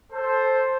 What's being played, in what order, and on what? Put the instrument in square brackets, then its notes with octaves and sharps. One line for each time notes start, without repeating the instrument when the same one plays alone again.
[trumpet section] A4 C5